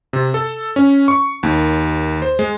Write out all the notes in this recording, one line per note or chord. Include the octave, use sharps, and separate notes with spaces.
C3
A4
C#4
C#6
D#2
C5
G#3